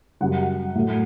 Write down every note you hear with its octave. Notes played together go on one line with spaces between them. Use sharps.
F#2 C#3 G3 F#5
A2 F#3 A3